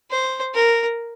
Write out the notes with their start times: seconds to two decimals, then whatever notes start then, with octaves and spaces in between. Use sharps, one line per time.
0.11 C5
0.54 A#4